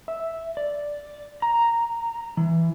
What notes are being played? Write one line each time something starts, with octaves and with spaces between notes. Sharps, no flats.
E5
D5
A#5
E3